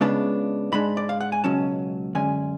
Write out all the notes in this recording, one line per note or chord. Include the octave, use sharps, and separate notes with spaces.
C#2 C#3 G#3 B3 D4 A5
G#2 G#3 D4 B5
D5
F5
F#5
G#5
C#2 B2 F#3 C#4 A5
F#2 D3 G#3 C#4 G#5